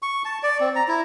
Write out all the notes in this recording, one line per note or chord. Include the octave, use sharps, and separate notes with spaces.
C#6
A5
D5
C4
A#5
E4